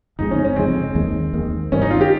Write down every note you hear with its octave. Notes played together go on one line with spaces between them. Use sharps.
G1 F2 C#3 G#3 D#4
C#4
C#4
G1 F2 C#3 G#3 C4
D#2 D#3 G#3
D#2 D#3 G#3
G#1 G2 D#3 G3 C#4
D#4
F4
G4